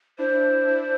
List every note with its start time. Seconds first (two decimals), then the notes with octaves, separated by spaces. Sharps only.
0.18 D4 E4 C5
0.67 D4 E4